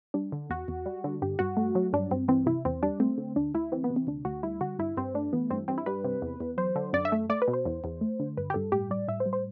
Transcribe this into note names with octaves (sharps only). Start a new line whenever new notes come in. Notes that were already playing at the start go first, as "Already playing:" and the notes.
G3 D4
D3
E2 F#4
E2
G3
D3
G2 G4
G2 F#4
A3
F#3
G2 D4
G2 C4
E3 C4
C3 E4
E2 C4
G3 D4
A3 C4
D3
D2 D4
D2 E4
E3 C4
B3
C3
C4
D2 D4
D2 F#4
G3 E4
D3 F#4
G2 E4
G2 C4
A3 D4
E3 B3
G2 C4
G2 C4
E4
G3 B4
C3
E2
E2
F#3 C5
D3
F#2 D5
E5
A3
A3 D5
B4
B2
C5
E2
E2
A3
D3
G2 B4
G4
G2 A4
A2 G4
G3 D5
A2 E5
C5
G3
C5